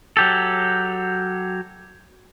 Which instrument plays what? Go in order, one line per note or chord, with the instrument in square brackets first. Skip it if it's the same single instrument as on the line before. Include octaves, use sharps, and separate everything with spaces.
[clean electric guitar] F#3 G4 A4